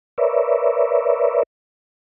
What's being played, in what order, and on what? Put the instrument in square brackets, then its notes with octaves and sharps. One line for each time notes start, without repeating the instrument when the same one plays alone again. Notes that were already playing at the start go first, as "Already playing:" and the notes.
[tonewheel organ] A#4 B4 C#5 D5 E5